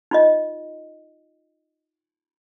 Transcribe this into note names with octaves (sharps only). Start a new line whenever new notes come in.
D#4 F4 D#5